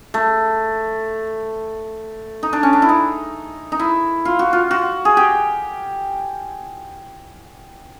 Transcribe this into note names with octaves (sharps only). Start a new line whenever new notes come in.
A3
D#4
D4
C#4
D4
E4
D#4
D#4
E4
F4
F#4
F4
F#4
G#4
G4